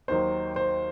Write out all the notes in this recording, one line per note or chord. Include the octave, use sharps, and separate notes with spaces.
D#2 D#3 F#3 C5
C5